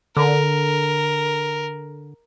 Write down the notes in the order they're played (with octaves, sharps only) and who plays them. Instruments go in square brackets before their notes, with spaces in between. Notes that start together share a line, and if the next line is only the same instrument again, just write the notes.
[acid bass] D3 [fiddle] A#4